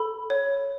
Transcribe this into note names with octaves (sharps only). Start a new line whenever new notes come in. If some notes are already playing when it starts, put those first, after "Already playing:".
Already playing: A4 B5
C#5